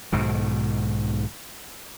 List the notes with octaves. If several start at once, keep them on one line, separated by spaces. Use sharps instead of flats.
B1 G#2 B2 D#3